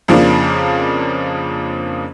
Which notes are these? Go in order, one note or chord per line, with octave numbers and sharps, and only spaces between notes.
F2 C#3 F3 A#3 D4